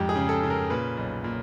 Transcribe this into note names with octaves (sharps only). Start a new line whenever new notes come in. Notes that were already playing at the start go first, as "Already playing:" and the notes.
Already playing: F2 G#2 G3 G4
G#4
C#3
A4
C#3
A#4
A#2 B4
B1
A#2